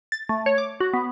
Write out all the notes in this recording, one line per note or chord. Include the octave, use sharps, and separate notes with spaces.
A6
A3
C#5
D6
F#4
B3